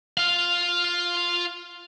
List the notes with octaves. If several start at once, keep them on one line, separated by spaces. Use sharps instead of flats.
F4 F5